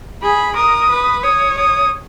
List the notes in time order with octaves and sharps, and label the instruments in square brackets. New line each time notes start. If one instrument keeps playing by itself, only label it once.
[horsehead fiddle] G#4 [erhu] B5
[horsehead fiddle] A#4 [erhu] D#6
[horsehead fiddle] B4
[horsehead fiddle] C#5 [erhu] D#6
[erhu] D#6